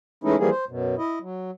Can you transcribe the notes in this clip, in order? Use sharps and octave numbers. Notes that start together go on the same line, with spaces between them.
E3 G#3 A3 C#4 D#4 E4
E3 F3 G3 A#3 G#4
C5
F#2 B2
E4 D#5
F#3